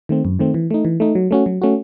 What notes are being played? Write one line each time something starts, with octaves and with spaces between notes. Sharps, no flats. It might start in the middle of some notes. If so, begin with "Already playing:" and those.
D#3 A3 C4
F#2
D#3 A3 C4
E3
A3 D#4
E3
A3 D#4
F#3
A3 C#4 F#4
F#3
A3 C#4 F#4